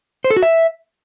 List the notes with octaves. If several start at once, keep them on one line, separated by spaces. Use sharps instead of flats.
C5
A4
F#4
E5